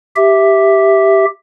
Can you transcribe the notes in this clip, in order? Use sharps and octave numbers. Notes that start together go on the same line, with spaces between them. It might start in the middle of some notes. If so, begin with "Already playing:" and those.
G4 E5